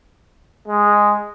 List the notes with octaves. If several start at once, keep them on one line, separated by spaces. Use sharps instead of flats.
G#3